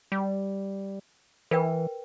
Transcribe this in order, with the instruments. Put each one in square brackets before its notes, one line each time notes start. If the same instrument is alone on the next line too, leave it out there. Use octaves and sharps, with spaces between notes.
[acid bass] G3
[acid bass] E3 [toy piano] A#4 B4 G5